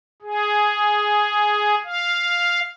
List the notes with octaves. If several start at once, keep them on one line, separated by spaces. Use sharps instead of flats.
G#4
F5